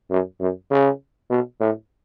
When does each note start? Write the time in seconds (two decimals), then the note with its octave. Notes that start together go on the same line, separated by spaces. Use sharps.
0.10 F#2
0.40 F#2
0.70 C#3
1.30 B2
1.60 A2